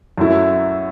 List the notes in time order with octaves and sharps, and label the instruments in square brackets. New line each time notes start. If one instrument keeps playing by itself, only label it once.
[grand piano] F#2 F#3 A3 E4